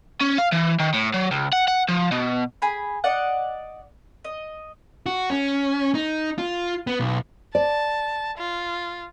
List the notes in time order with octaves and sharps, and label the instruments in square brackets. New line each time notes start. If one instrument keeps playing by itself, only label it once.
[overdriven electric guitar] C#4
F5
E3
D#3
A2
F#3
C#2
F#5
F#5
F3
B2
[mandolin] G#4 B5
D5 D#5 F#5
D#5
[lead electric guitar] F#4
C#4
D#4
F4
B3
B1
[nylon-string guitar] D5 [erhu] A5
[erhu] F4